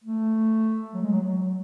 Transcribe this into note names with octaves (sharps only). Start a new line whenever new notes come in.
A3
F#3
G#3
F#3
F#3